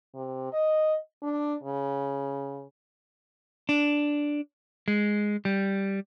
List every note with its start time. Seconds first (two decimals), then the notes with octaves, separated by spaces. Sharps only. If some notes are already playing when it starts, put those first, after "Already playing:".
0.15 C3
0.53 D#5
1.22 D4
1.63 C#3
3.69 D4
4.88 G#3
5.45 G3